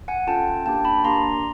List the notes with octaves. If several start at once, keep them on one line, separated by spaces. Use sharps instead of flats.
F#5 G#5
C#4 F4 A4 G5 A5
A#3 D4 G4 G5 A5
A5 B5
A#3 D4 G4 A#5 C6